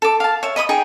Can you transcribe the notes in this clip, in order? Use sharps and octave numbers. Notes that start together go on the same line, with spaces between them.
A4 D6
F5 A5
C#5 E5
D#5 B5 D6 D#6
D#4 G#4 G5